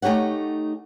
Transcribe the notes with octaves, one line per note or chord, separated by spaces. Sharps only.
A3 D#4 G4 C#5 F#5